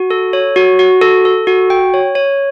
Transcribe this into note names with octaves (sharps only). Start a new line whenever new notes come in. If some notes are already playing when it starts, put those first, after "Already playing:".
Already playing: F#4
A4
C#5
F#4
F#4
A4
A4
F#4
G5
C#5
C#5